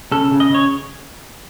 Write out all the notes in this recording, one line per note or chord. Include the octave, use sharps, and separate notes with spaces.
C#3 A4
C#3
D#5
C#3 C#5